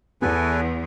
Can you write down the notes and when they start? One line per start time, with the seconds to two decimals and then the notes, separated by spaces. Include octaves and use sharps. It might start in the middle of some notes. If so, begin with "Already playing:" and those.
0.22 E2 B3 A4 B4 G#5